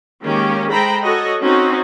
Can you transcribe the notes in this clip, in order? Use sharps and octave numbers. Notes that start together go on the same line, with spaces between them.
D#3 G#3 A#3 C#4 G4
G#3 A4 C5 G5 A#5 B5
F#4 A4 C#5 D#5 F#5
C4 C#4 D#4 F#4